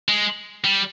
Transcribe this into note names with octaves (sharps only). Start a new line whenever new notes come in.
G#3
G3